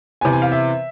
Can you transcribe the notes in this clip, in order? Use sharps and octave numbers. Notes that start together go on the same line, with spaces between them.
C3 E3 B3 G#5
G#5
F5
E5